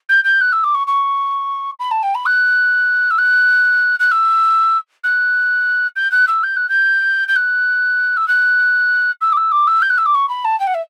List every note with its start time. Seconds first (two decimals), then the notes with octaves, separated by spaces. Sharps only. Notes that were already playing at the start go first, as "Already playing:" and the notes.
0.09 G6
0.24 G6
0.41 F#6
0.52 E6
0.64 D6
0.74 C#6
0.87 C#6
1.79 B5
1.91 A5
2.03 G5
2.15 B5
2.26 F#6
3.10 E6
3.18 F#6
3.99 F#6
4.11 E6
5.04 F#6
5.96 G6
6.11 F#6
6.28 E6
6.43 G6
6.56 F#6
6.69 G6
7.28 G6
7.36 F#6
8.17 E6
8.28 F#6
9.21 E6
9.32 D6
9.37 E6
9.52 D6
9.67 E6
9.82 G6
9.90 F#6
9.98 E6
10.06 D6
10.14 C#6
10.29 B5
10.44 A5
10.60 G5
10.67 F#5
10.74 E5